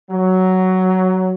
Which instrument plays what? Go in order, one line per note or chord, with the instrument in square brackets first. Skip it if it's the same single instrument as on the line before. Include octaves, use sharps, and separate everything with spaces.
[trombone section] F#3